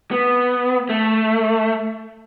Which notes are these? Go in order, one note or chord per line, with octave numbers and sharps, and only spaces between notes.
B3
A3